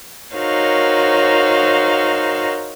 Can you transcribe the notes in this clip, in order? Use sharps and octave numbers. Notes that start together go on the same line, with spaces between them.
D#4 F#4 A#4 C5 C#5 F5